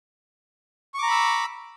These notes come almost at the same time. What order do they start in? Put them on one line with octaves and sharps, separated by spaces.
C#6 D6 A#5 B5 E6